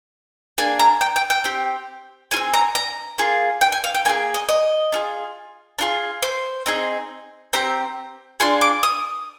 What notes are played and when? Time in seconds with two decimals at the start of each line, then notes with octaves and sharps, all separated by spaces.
0.58 A#3 D4 G#4 G#5
0.79 A#5
1.01 G5
1.16 G5
1.30 G5
1.44 C4 G4
2.31 F4 G#4 G#5
2.36 C4
2.54 A#5
2.75 A#5
3.18 A#3 F4 G#4
3.61 G5
3.72 G#5
3.84 F5
3.94 G5
4.05 A#3 F4 G#4 G#5
4.34 D#5
4.49 D#5
4.92 D4 F4 G#4
5.79 D4 F4 G#4
6.23 C5
6.66 C4 D#4 G#4
7.53 C4 G4 A#5
8.40 D4 F4 G#4 C6
8.61 D6
8.83 D#6